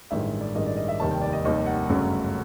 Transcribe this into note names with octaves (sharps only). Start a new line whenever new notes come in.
A1 G2 D#3 G#3 E5
D5
A1 G2 D#3 G#3 D#5
D5
D#5
E5
F1 D#2 D#3 G3 A5
G5
D5
D#5
F1 D#2 D#3 G3 D#5
F#5
G1 F#2 C#3 F#3 A3